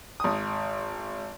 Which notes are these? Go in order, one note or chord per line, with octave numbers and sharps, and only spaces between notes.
G#1 D#6